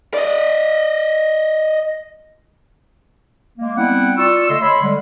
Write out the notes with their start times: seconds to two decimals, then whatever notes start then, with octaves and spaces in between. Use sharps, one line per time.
0.14 D5 D#5
3.58 G#3 A#3
3.76 G3 B3 C4 E4 F#5 G5
4.17 F4 D5 C#6 E6
4.48 D3 A3 D#5 C6 E6
4.61 C#5 B5 C6
4.82 D3 G3 G#3